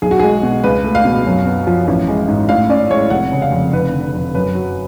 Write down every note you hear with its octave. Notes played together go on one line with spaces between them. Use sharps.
B1 G#4
F#4
G#3 G#4
B2
C#2 B4
A3
F5
B2
F#2
B3
F3
A1
G#3
G#2
A2 F5
C#4 D5
G#3 C#5
F1 F#5
C#3
F5
F2
F1 B4
D3
F2
F#2 B4
F#3